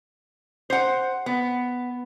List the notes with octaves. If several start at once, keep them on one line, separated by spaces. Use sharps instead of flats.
C5 F#5
B3